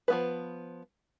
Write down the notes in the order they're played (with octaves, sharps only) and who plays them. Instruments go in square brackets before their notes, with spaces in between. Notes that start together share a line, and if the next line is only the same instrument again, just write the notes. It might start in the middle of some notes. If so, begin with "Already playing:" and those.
[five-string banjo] F3 B3 B4